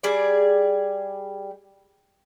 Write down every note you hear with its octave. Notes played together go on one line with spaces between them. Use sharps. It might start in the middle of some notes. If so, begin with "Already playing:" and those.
G3 G#4 D5